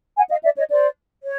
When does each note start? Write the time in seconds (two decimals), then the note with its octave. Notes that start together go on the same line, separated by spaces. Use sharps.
0.17 F#5 G#5
0.30 D#5 F5
0.44 D5 E5
0.57 C#5 D#5
0.71 C5 D5
1.23 C#5